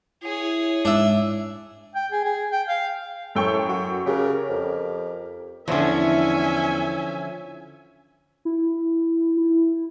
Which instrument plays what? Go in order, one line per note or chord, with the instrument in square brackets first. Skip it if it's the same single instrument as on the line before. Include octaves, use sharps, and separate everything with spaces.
[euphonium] E4 [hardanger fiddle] G#4 C#5
[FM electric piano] G#2 [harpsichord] D4 E5
[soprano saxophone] G5
G#4
G#4
G5
F5
[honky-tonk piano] F#2 G5 C#6 [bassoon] A2
[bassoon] F#4
[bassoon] C#3 [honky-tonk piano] G4 A#4
[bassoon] F2
[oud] E2 [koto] D3 F3 [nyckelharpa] C#4 [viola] E5 G#5
[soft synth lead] E4
E4